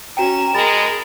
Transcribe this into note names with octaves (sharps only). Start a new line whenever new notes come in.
C#4 F#4 G5 A#5 E7
G#3 A#4 B5 A6